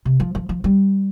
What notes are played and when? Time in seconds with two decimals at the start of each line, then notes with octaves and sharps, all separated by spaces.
0.05 C3
0.20 F3
0.35 F3
0.49 F3
0.64 G3